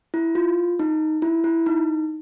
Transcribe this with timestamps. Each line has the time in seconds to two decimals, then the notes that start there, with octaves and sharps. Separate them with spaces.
0.14 E4
0.35 F4
0.79 D#4
1.22 E4
1.44 E4
1.66 D#4